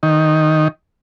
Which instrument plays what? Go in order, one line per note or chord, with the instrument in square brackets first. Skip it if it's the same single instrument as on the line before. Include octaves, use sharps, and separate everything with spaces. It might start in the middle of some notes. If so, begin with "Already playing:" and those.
[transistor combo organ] D#3